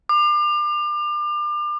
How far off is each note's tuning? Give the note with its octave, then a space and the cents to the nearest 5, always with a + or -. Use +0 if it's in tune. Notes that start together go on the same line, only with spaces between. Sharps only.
D6 +35